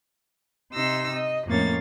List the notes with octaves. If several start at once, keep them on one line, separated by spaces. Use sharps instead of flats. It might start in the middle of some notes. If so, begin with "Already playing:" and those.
C3 D#4 C6 E6 A#6
D#5
F2 A2 A#3 C#4 C#5 A6